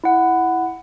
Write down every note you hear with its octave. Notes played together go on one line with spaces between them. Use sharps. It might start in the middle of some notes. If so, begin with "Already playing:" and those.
E4 F#5